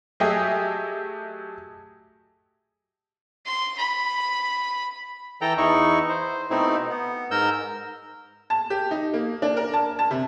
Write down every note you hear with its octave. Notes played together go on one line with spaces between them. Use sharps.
F#3 A3 G4 G#4 D#5 E5
C6
B5
E3 A4 G5 A#5
E2 D#4 E4 C#6
C5
B2 A3 C4 D#4 E4
B3
G#2 A#4 E6 G6
A5
G4
D#4
A#3
D4
A#4
A5
A5
C3